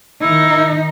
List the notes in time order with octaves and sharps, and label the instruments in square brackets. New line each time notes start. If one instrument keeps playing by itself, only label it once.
[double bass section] D#3 [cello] D#4 [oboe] E4